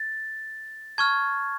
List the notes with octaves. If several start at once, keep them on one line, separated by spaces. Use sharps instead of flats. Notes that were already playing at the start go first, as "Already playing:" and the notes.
Already playing: A6
A5 C#6 F6 G#6